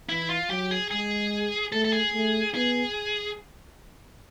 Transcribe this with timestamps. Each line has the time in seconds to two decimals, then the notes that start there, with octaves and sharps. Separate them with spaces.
0.09 E3 E4
0.30 F4
0.50 F#3 G4
0.71 G#4
0.91 G#3 G#4
1.72 A3 A4
1.85 A4
1.93 G#4
2.14 A3
2.55 B3 G#4